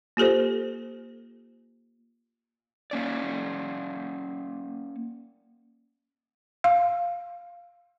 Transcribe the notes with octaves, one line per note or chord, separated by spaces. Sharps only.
A#3 F4 G4 A4 C5
A#3 C#4 D5
F5